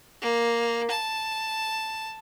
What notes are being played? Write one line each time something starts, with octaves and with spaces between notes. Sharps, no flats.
A#3
A5